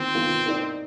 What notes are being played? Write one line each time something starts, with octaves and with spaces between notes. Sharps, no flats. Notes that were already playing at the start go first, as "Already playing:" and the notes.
Already playing: D#3 A#3 C4 F4
D#3 A#3 F4
A#3 D#4 A#4 D5